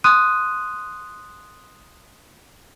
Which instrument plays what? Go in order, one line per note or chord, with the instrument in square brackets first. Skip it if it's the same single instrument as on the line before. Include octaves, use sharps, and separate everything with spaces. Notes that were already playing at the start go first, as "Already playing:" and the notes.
[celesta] C6 D#6 F#6 D#7